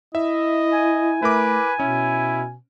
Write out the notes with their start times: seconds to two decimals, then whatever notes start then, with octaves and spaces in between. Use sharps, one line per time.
0.15 E4 D#5 E5
0.73 G#5
1.22 A3 E4 A#4 B4 D6
1.80 B2 C#4 E4